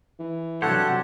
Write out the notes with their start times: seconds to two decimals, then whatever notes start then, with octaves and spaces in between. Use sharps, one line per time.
0.19 E3
0.62 G2 C3 F#3 G4 A4 C5 C#5 F#5